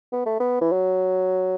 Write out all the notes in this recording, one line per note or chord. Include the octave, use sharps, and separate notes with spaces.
B3
A3
B3
E3
F#3